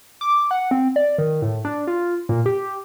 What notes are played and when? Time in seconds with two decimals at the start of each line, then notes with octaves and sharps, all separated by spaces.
0.21 D6
0.51 F#5
0.71 C4
0.96 D5
1.18 D#3
1.42 A2
1.65 D4
1.87 F4
2.29 A#2
2.46 G4